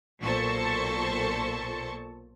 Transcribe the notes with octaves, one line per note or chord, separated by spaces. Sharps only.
B1 A#2 A4 C5 A5 C#6